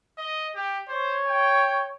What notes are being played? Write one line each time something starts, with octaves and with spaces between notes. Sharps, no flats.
D#5
G4
C5 C#5
G5